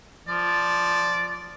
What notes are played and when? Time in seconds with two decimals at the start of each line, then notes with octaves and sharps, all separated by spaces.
0.28 F3 D5